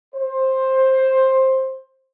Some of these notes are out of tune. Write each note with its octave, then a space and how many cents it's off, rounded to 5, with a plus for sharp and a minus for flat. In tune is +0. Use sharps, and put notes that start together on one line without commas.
C5 +10